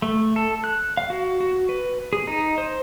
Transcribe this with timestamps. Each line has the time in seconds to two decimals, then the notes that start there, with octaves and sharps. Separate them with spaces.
0.02 A3
0.36 A4
0.64 F#6
0.97 F5
1.10 F#4
1.40 F#4
1.69 B4
2.13 G#4
2.27 D#4
2.58 C5